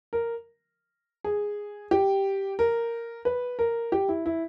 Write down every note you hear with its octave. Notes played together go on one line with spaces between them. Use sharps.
A#4
G#4
G4
A#4
B4
A#4
G4
E4
E4